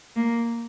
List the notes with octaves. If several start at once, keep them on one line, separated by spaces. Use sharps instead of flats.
A#3